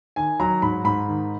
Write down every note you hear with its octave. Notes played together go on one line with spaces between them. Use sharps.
D#3 G#5
F#3 A#5
G#2 B5
G#2 B5
D#3